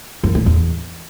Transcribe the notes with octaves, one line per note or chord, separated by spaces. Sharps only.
F#2
A2
E2